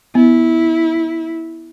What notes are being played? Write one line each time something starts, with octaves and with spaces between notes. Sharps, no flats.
B3 E4